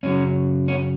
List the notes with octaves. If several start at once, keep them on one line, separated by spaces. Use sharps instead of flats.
F#2 C#3 F#3 C#4
C#4